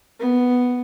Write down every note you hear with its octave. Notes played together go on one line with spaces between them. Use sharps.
B3